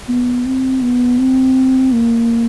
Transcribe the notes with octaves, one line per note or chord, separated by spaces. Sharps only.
B3
C4
B3
C4
A#3